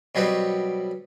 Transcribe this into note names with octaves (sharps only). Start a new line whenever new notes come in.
B2 F#3 G3 B3 C4